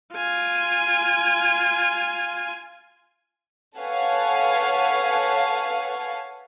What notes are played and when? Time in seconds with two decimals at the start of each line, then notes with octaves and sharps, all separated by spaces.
0.14 F4 G#5
3.77 A4 B4 C#5 F5 F#5 G#5